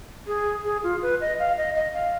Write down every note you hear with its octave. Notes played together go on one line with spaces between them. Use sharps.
G#4
G#4
F4
B4
D#5
F5
D#5
D#5
F5